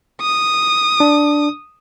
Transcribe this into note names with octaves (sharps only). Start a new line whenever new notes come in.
D#6
D4